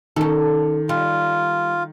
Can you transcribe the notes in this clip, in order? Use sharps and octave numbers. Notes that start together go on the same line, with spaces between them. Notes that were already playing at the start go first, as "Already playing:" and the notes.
D#3 C#4 A4
G3 F4